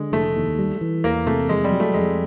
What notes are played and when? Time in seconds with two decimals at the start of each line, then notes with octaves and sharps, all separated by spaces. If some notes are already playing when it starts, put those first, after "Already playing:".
Already playing: D3 G#3
0.12 F1 A3
0.36 D#2
0.59 G3
0.81 E3
1.04 E2 A#3
1.26 C3 A3
1.49 F2 G#3
1.64 G3
1.72 F#3
1.80 A3
1.94 F2 G#3